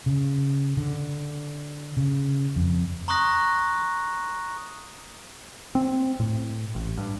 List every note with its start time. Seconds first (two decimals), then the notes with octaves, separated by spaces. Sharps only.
0.06 C#3
0.77 D3
1.97 C#3
2.56 F2
3.08 A#5 C6 C#6 D#6 F#6 A#6
5.75 C4
6.20 A2
6.75 A1
6.98 G2